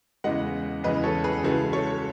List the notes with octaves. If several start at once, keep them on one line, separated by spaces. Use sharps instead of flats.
E2 C#3 E3 G#3 D#5 F#5
E2 C#3 E3 G#3 B4 D#5
A4 C#5
G#4 B4
C#2 C#3 E3 G#3 F#4 A4
A4 C#5